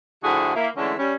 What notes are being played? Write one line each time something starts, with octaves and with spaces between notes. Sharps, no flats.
A2 D3 F3 E4 F#4 G#4
A#3 E4
D3 E3 G#3 A3 C#4 D4
G3 C#4